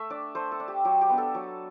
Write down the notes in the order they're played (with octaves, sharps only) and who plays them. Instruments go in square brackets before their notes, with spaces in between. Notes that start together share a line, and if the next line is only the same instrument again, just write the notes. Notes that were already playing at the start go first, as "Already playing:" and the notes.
Already playing: [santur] A3 E5
D4 D5
A3 C5
A4
D4
G4
F#3 G4
G4
B3 D4
A4
F#3